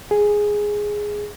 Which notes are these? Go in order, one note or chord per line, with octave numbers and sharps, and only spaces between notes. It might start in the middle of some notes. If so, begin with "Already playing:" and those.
G#4